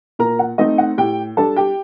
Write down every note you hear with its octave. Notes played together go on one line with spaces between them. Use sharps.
A#2 A#4 A#5
F#5
A3 C4 D#4 D#5
F#5
A2 G4 G5
G3 D4 A4 A5
G4 G5